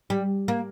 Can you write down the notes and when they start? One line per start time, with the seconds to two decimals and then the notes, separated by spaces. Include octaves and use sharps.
0.10 G3
0.48 A#3